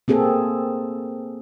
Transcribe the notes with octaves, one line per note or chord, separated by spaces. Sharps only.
A#3 C4 G#4 A4